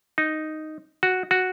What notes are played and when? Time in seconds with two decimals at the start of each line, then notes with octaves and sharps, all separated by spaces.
0.18 D#4
1.03 F#4
1.31 F#4